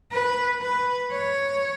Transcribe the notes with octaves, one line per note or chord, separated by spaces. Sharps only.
B4
B4
C#5